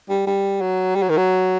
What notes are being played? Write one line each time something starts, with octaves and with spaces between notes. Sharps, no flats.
G3
G3
F#3
G3
F#3
D#3
F#3